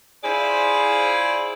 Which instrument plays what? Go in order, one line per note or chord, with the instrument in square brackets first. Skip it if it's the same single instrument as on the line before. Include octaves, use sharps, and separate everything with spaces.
[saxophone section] E4 F4 G#4 C5 D5